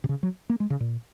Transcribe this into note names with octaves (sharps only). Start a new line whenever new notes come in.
C3
C#3
F#3
A#3
G#3
C#3
A#2